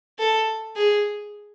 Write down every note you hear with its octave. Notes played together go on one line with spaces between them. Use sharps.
A4
G#4